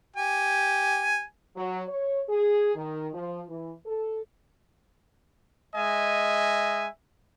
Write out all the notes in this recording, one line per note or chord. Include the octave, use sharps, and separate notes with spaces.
G4 G#5
F#3
C#5
G#4
D#3
F3
E3
A4
G#3 D#5 E5 G#5